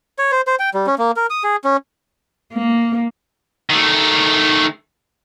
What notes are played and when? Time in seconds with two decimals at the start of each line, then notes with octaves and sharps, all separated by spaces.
0.19 C#5
0.32 C5
0.47 C5
0.59 G5
0.74 G3
0.87 C#4
0.98 A#3
1.16 A#4
1.30 D#6
1.44 G#4
1.64 C#4
2.54 A#3
3.70 D#3 A3